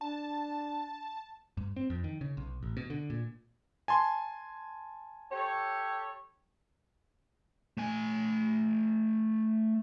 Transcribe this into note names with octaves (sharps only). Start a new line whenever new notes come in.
D4 A5
G2
C4
F2
D#3
C#3
B1
A1
B2
D3
A#2
G#5 A5 C6
G4 A4 C#5
A3 G#5